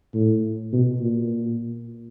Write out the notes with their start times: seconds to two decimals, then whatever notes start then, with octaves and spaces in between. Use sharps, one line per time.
0.14 A2
0.73 B2
1.01 A#2